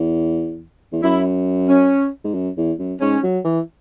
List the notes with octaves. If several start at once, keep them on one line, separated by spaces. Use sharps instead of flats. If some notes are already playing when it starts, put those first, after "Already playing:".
Already playing: E2
E2
F#2 E4
C#4
G#2
F#2
E2
F#2
G#2 C#4
F#3
E3